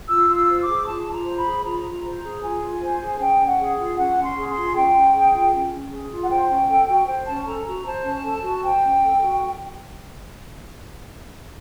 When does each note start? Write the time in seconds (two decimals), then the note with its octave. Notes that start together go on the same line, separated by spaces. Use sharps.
0.09 F4 E6
0.29 F4
0.35 E6
0.48 C5
0.61 D6
0.67 G#4
0.87 F4 A5
1.07 F4
1.13 A#5
1.25 C5
1.38 B5
1.45 G#4
1.64 F4 A#5
1.84 F4
2.03 C5
2.23 G#4
2.42 F4 G#5
2.62 F4
2.81 C5
3.00 G#4
3.20 C#4 G5
3.39 C#4
3.46 F#5
3.59 G#4
3.78 F4
3.97 C#4 F#5
4.17 C#4
4.23 C6
4.37 G#4
4.50 C6
4.56 F4
4.75 C#4 G5
4.94 C#4
5.14 G#4
5.33 F4
5.53 C#4
5.72 C#4
5.91 G#4
6.10 F4
6.24 F#5
6.30 C5 G5
6.49 C#4
6.69 A4
6.88 F#4
7.08 C5
7.27 C#4 A5
7.46 A4 A#5
7.65 F#4 A#5
7.86 C5 A5
8.05 C#4
8.24 A4
8.44 F#4
8.62 C5 G5
8.82 C#4
9.02 A4
9.21 F#4